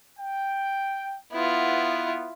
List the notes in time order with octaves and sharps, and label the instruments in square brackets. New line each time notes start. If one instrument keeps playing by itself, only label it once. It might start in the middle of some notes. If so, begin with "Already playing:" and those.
[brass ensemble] G5
[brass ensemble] B3 [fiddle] E4 F4